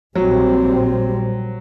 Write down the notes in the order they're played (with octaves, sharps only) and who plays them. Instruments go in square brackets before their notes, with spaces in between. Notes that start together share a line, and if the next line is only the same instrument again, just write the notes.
[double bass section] A#1 A#2 G3 C4 [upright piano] F#3